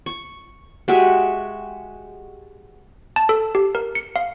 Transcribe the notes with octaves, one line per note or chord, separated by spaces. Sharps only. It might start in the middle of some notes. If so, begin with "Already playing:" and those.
C#6
G#3 F#4 G4 E5
A5
A4
G4
A#4
C#7
F5